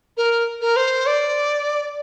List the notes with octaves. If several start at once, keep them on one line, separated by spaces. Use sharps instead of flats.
A#4
A#4
C5
D5